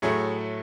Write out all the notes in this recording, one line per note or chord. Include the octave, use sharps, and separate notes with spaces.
A2 F#3 A3 G#4